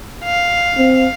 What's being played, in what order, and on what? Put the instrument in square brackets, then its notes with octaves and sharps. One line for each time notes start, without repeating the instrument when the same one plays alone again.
[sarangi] F5
[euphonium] C4